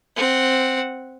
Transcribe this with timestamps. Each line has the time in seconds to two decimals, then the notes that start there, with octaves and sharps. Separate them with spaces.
0.16 C4 F#5